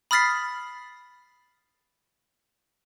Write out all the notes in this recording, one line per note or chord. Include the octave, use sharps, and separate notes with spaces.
B5 D#6 F6 A6 B6 C7